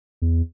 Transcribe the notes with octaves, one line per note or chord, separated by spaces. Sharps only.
E2